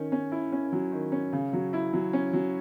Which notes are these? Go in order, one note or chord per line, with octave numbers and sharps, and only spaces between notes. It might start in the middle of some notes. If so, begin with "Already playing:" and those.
Already playing: D#3 C#4
C#4
E4
C#4
F#3
D#3
C#4
C#3
F#3
E4
F#3
C#4
F#3